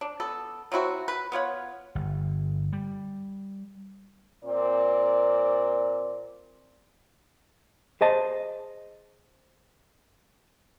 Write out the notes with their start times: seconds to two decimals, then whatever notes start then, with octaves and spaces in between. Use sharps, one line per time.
0.01 D4
0.20 B3 A4
0.72 F#3 C4 E4 F#4
1.08 B4
1.32 B3 F4 C#5 F#5
1.95 G1
2.73 G3
4.44 A#2 C4 D5
8.01 G#4 C5 D#5 A5